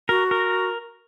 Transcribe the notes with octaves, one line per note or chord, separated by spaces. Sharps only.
F#4 A#4
A#4